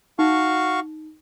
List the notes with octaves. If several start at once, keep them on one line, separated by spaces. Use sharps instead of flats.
D#4 F#4 F5 C#6